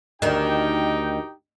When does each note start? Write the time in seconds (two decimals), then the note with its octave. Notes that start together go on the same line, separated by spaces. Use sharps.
0.22 D2 D#3 D#4 G4 G5